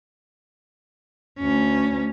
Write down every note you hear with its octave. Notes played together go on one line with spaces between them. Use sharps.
D2 C#4